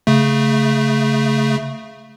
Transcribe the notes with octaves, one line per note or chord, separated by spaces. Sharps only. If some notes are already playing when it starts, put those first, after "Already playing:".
C#3 A3